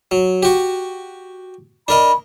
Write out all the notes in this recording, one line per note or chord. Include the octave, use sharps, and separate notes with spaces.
F#3
F#4 G4
D4 A#4 D#5 B5